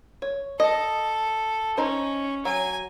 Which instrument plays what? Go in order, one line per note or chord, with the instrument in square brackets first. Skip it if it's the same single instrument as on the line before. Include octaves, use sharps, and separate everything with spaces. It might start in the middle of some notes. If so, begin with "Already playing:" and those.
[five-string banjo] C#5
[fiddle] A4 [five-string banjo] D#5
[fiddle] C#4 [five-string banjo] D#4 C5
[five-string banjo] F#3 [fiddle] G#5